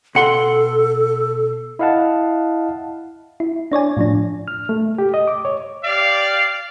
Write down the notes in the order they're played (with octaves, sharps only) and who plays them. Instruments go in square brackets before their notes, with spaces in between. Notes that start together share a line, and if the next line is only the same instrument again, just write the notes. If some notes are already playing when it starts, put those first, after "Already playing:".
[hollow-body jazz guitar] B2 F#5 C6 [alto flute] A4
[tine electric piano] E4 D#5 F5 F#5 A5
[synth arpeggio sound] E4
D4 C#5 D5 G#5
A2 F3 D4
[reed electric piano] F6
A3
G4
D#5
D6
C#5
[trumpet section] G4 D5 F5